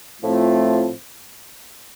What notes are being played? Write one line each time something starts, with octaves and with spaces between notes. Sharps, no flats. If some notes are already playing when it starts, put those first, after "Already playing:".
A2 F3 A3 C4 F4